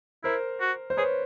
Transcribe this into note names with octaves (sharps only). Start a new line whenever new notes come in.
E4 A#4 C5
F#4
C5
G#4 B4 C#5